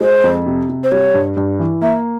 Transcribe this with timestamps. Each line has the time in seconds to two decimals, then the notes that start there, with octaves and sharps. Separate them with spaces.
0.01 G#3 C5
0.24 F2
0.46 C3
0.69 C3
0.84 C5
0.92 G3 C#5
1.14 G2
1.37 G2
1.59 E3
1.82 A#3 E5